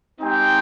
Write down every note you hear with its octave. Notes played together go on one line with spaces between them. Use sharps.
G#3 C4 D#4 G4 G5